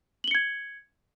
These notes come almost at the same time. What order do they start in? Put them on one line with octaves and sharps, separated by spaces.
F#7 G7 C#7 G#6